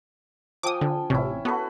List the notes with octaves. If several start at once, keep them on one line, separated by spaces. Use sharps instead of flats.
F3 G5 G#5 D6 D#6
D3
A1 C3 C#4 E4
B3 F#4 A4 B4